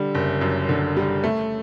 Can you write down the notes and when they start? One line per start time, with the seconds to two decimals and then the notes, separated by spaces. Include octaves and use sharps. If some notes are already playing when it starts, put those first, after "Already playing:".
Already playing: D3 G3
0.15 F#1
0.41 F#2
0.69 D3
0.97 G3
1.24 A3